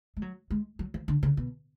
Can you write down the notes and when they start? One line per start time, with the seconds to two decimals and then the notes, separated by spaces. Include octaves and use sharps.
0.17 G#3
0.22 F#3
0.51 G#3
0.79 F#3
0.94 F3
1.08 D3
1.23 C#3
1.37 B2